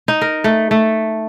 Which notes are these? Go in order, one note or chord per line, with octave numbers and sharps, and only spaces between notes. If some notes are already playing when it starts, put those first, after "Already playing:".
D#4
A#4
A3
A3